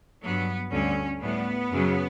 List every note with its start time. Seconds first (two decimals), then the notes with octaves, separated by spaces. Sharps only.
0.23 G2 F#3 B3
0.73 D2 D3 G3 C#4
1.22 A2 G3 B3
1.71 F#2 C#3 F#3